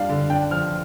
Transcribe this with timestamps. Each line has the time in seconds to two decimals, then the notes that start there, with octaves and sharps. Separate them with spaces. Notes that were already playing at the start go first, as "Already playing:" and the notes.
Already playing: G3 D4 F5
0.09 D3
0.30 D4 G5
0.51 F3 F6